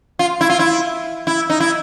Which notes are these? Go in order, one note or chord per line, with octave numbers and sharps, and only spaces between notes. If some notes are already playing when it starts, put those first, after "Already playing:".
F4
E4
F4
E4
E4
D#4
E4